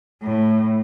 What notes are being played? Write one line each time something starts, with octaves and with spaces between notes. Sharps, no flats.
A2